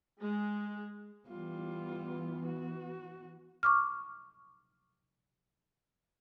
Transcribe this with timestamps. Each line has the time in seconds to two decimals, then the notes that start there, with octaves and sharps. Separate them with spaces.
0.21 G#3
1.28 E3 G3 B3 F4
2.46 F#4
3.63 C#6 D6 F6